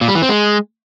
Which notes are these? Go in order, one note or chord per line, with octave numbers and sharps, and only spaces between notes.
A#2
G3
E3
C4
G#3